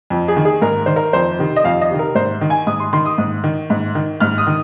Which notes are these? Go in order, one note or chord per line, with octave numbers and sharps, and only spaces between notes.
F2
G#4
D#3
G#4
G#2 A#4
D#3 C5
A#4
F2 C5
C3 D#3
D#5
F2 F5
D#5
C3 D#3
A#4
G#2 C5
D#3
G#5
G#2 D#6
C6
D#3 C6
D#6
G#2
D#3
G#2
D#3
G#2 F6
D#6
D#3